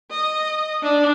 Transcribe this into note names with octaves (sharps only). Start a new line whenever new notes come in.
D#5
D4